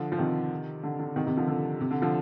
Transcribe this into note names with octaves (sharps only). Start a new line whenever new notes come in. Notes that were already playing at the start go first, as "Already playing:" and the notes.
Already playing: D3 F3
F3
C3 D#3
D3
D3
C3 D#3
C3 D#3
D3 F3
D3
C3
D3
D3 F3